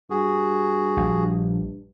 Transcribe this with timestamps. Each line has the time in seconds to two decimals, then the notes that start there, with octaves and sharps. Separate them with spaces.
0.10 G2 F#4 G#4
0.97 A#1